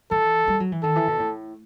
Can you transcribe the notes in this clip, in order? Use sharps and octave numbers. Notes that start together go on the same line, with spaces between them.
E3 A4
G3
F#3
E3
D#3 A4
E3
B2
A2